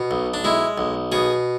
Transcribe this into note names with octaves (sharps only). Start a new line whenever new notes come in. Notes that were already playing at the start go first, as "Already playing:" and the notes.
Already playing: B2
B1
D4
G#3 E4
B1
B2 G#4